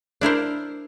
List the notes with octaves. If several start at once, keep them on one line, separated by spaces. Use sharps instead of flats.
D4 E4 A#4 C5